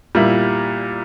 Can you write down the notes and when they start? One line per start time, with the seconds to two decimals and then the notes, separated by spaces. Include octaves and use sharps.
0.15 A#2 G3 A#3 E4